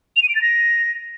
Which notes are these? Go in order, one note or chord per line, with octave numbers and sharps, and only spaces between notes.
F7
D#7
D7
A6
A#6